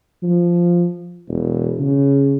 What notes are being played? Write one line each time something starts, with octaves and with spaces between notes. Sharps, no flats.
F3
E1
C#3